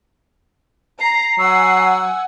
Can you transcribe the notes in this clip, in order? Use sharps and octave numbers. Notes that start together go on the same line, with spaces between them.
A#5 C7
F#3 F#5 G#5 E6